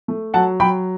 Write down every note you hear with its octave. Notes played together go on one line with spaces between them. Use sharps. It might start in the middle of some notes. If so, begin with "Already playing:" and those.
A3
F#3 F#5 A5
F#3 G5 B5